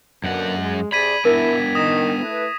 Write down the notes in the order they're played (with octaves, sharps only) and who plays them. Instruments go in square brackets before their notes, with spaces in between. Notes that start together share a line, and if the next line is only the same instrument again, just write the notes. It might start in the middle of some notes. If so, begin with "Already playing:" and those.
[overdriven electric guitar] F#2 F#5 [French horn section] B2 D3 A#3
[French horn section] G#3
[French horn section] C3 G#4 D5 [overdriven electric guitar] B5 [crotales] G#6 B6 D#7
[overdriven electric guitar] B3 D4 [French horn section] E4 [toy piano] A#4
[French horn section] D#3 [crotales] D#6 A#6 E7
[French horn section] A3 E4 B4